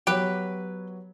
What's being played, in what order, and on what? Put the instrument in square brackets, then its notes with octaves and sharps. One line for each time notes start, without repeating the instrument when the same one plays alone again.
[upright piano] F#3 B3 F#4 C#5 [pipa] G4 B4